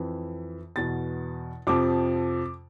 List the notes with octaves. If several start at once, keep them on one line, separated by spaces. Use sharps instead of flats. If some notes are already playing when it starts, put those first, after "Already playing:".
Already playing: F2 E3
E2 B2 A6
F2 C3 F3 D6